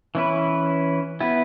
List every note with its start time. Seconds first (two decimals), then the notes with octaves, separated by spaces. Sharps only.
0.15 E3 C#4 E4 B4
1.20 B3 E4 B4